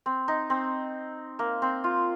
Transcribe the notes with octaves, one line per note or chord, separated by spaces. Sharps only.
C4
D#4
C4
A#3
C4
F4